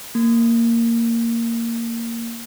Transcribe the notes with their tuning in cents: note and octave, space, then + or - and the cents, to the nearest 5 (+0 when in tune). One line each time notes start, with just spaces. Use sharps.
A#3 -10